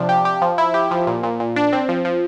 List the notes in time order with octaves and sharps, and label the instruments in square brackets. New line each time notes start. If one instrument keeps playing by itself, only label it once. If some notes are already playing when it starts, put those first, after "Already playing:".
Already playing: [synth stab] C3 F3 D4
G4
G4
F3
E4
G4
F3
A#2
A#2
A#2
D4
C4
F3
F3